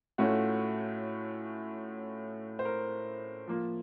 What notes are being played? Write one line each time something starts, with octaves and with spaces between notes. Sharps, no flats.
A2 A3 C#4 F4 F#4
C5
A#4
F3 A#3 F4